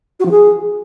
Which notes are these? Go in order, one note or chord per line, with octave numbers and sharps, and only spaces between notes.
F#4
F3
G#4